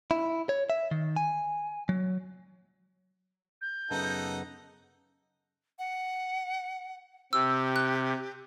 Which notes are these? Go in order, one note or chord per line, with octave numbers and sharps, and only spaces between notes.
E4
C#5
E5
D#3
G#5
F#3
G6
F#2 C#3 B3 D#4 A4 F#5
F#5
C3 G4 E6
F#6